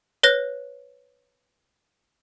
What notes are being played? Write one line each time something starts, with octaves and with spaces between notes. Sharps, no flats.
B4 C#5 F#6 A#6